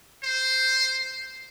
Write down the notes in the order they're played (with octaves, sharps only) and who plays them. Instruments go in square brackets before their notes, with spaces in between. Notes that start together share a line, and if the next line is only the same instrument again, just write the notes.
[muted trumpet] C5